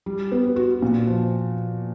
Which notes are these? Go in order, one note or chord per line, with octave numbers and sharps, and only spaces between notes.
G3
B3
F#4
A#2
F3